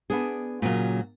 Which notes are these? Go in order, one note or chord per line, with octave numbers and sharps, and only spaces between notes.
B3 D4 G#4
A#2 C#3 F#3